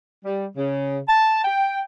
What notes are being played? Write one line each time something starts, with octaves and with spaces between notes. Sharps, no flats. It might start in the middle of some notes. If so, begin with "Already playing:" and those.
G3
C#3
A5
G5